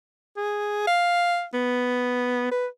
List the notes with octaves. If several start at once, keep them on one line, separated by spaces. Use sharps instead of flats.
G#4
F5
B3
B4